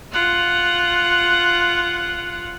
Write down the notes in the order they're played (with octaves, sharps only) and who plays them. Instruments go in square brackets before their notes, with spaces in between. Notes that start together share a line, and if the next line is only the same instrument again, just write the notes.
[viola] F4 F#5